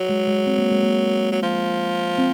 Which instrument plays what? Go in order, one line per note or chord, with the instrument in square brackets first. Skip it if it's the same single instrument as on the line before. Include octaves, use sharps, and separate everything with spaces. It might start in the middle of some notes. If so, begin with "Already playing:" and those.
Already playing: [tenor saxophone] F#3
[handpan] G#3
G#3
C4
A#3
G#3
A#3
[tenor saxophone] F#3
F3
[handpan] C4